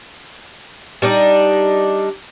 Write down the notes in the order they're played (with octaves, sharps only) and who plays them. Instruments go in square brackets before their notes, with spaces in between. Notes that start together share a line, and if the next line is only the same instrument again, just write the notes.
[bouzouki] G3 D4 D#4